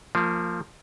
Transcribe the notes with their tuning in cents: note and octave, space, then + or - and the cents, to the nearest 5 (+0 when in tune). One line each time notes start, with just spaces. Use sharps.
F3 +0 A#3 -30